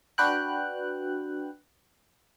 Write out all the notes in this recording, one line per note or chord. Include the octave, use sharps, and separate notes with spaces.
D4 F#4 B4 G5 F#6